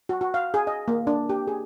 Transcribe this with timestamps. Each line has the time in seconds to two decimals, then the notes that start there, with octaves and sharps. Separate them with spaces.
0.09 F#4
0.21 F#4
0.34 F5
0.54 G#4
0.67 D#5
0.88 A#3
1.07 D4
1.29 G4
1.47 G#4